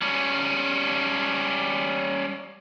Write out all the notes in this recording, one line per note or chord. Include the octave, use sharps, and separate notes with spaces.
G3 C#4